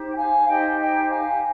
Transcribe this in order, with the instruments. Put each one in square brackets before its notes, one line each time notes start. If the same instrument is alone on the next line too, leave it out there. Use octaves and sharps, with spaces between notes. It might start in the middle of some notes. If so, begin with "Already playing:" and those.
Already playing: [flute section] D#4 G4 C5
G5
F5 G#5
D#4 G4 C5 D#5 G5
D#5 G5
F5 G#5